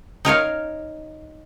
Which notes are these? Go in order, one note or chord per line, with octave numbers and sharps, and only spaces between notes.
D#4 A#4 C#5 F5